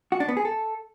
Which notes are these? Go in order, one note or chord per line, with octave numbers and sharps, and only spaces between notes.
F#4
D4
B3
G#4
A4